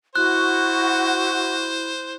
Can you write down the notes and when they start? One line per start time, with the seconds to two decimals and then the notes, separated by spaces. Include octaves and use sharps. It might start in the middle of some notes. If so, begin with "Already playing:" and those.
0.16 E4 F#4 C5 F#6